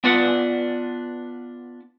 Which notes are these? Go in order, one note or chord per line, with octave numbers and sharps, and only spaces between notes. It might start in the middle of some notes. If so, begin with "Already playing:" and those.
B3 D4 F4 B4 D5 F#5